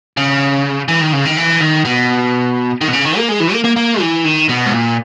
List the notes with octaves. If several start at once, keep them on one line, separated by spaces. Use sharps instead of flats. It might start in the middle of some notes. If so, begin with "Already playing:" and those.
C#3
E3
D#3
C#3
D#3
E3
D#3
B2
D#3
B2
C#3
D#3
A#3
G#3
E3
A#3
A#3
A#3
E3
D#3
B2
G#2
A#2